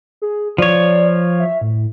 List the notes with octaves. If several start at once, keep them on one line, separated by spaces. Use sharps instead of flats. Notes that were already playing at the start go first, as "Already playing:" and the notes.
G#4
F3 C#5 D5
E5
A2